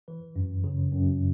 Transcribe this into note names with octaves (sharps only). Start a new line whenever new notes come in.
E3 B4
F#2
C#3
F#2